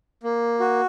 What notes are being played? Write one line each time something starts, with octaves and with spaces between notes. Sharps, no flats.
A#3
F#4